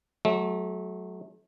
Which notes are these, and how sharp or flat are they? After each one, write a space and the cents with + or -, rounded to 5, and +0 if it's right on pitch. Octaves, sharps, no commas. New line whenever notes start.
F#3 +0 A3 -30